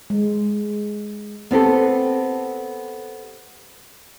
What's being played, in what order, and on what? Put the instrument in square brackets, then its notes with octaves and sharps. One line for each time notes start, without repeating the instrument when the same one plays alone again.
[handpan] G#3
[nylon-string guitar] B3 C4 G4 A4